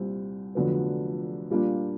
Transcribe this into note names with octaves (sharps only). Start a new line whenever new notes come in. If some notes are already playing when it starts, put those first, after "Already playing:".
Already playing: C2 A#2 G3 C4
F1 F2 D3 F#3 B3
A#2 G3 A#3 D4 F4